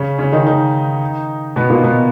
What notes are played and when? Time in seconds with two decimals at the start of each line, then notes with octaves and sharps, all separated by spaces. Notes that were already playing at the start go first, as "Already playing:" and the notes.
Already playing: C#3 C#4
0.18 C#3 C#4
0.32 D#3 D#4
0.47 D#3 D#4
1.56 B2 B3
1.70 A#2 A#3
1.83 B2 B3